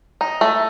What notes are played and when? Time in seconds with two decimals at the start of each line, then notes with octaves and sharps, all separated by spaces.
0.21 D#4
0.41 A3